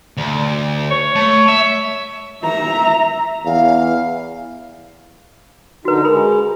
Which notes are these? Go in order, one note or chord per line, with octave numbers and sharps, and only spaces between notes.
D2
C#5
A3
E5
E5 A#5
E2 F5
D3 D#4 F#4 B4
G#3 G#4 A#4 B5